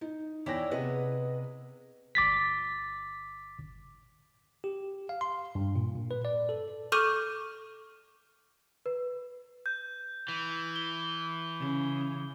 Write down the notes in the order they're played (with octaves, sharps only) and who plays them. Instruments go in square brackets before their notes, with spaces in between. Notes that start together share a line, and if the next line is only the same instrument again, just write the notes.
[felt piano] D#4
[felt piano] E2 G5 A#6 [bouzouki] E4 C#5 D5
[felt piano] C3 G#4 [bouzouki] B3 B4 D#5
[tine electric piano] G1 D6 A6 B6
G4
F5
C6
G2
A#2
A#2
B4
D5
A4
[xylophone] A4 C#6 D6 F6 G6 D#7
[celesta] B4
[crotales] G6
[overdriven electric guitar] E3
[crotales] G7
[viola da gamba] C#3